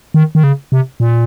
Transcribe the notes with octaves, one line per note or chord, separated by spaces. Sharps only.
D#3
D#3
C#3
C3
A#2